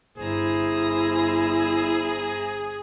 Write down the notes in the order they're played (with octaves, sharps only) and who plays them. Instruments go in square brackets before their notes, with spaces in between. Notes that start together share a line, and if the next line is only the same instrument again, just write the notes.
[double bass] G1 [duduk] E4 [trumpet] G#4 [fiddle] C5 A#5